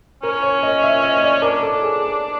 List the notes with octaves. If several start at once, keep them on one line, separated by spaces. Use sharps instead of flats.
C#4 A#4
C#5
D#5
E5
D#5
D5
D4 A#4
A4
G#4